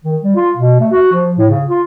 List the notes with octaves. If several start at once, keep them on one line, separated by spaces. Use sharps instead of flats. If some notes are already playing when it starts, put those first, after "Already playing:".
D#3
G3
F4
B2
A3
F#4
F3
A2
C#3
F4